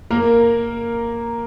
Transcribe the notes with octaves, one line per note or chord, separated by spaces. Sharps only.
A#3 A#4